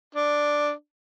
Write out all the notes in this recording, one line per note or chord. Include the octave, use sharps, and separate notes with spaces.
D4